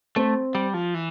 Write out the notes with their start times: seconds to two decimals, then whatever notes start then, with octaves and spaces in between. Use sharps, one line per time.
0.16 A3 C4
0.55 G3
0.74 F3
0.94 E3